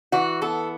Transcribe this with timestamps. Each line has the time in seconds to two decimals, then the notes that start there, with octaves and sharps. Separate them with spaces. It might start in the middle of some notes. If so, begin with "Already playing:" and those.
0.12 E3 F#4
0.41 B3 A4